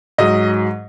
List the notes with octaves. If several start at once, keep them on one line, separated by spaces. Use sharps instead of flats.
G#2 F#3 D#5